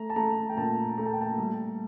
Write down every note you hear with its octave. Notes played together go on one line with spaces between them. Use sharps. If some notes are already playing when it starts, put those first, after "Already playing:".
Already playing: A3 A#5
A5
A3 A#5
G5
A#2 A5
A3 A#5
A5
G5
A5
G3